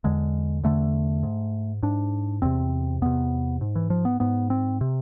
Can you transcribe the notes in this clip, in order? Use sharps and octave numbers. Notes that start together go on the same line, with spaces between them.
E2 D3 G#3
E2 D3 A3
G#2
G#2 D4
E2 C3 C4
E2 C3 B3
G#2
E3
F3
B3
G#2 B3
C4
C3